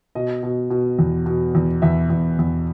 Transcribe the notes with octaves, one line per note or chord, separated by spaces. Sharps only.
B2 D#5
B2
B2
E2
B2
E2
E2 E5
E2
E2